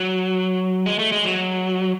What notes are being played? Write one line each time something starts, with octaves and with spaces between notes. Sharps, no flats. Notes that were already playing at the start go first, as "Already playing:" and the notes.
Already playing: F#3
G#3
A3
G#3
F#3